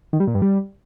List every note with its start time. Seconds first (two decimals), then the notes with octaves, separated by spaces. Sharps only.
0.13 D#3
0.20 G3
0.27 A#2
0.35 G2
0.42 G3